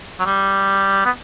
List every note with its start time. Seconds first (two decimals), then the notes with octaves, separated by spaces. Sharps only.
0.20 F#3
0.26 G3
1.05 B3